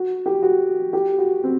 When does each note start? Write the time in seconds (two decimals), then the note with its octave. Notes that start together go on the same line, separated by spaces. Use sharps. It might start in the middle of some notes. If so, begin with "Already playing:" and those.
Already playing: F#4
0.26 G4
0.43 F#4
0.93 G4
1.19 F#4
1.44 C4